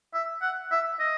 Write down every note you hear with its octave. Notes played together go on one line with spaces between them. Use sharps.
E5
F#5
E5
D#5